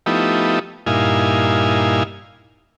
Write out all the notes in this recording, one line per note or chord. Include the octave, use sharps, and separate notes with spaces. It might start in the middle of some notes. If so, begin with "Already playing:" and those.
F3 A3 B3 D#4 E4 G4
G2 A#2 D#4 E4 F5 G#5